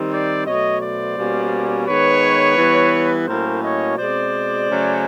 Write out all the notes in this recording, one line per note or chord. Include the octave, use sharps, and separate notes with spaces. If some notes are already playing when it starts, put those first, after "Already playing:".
Already playing: D#3 G3 C4
C5 D5
B2 F#3 A3 C#5 D#5
C5 D5
B2 G3 A#3 C#4
D#3 G#3 B3 B4 C#5
E3 G3 B3
A2 F#3 A#3 C#4 A#4 C5
C#5 D#5
B2 G#3 C4 C5 D5
C#3 F#3 A3 C#4